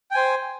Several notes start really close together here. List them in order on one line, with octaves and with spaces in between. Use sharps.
G5 G#5 C5